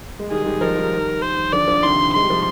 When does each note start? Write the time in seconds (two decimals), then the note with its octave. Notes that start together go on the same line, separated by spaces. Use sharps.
0.19 G#3
0.31 D#3 G3 G#4
0.42 G#3
0.46 D#3 G3
0.61 F3 G#3 A#4
0.77 D#3 G3
1.22 C5
1.53 D3 F3 D5
1.68 D3 F3
1.83 C3 D#3 C6
2.14 G#3 C6
2.23 G3
2.30 F3